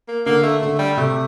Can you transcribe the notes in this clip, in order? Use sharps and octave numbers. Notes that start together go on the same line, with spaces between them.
A#3
D3 A#3
A3
D3 A3
G3
C3 A3